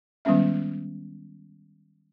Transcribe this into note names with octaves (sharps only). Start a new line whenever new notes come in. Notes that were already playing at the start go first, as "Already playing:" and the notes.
D#3 G3 G#3 B3 C#4 E5